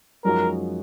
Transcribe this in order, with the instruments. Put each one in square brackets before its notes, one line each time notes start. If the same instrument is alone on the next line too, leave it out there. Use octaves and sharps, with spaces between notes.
[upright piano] F#2 F3 G#3 D#4 F#4 [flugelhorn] A#4